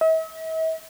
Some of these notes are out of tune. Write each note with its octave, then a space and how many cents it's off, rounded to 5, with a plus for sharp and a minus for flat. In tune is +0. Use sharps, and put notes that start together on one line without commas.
E5 -45